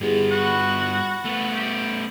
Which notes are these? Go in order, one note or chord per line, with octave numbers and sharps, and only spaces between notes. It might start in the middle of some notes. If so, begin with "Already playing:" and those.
G2 B3 E4 G4 G#4
F#4 F#5 B5 C#6
A3 B3
G4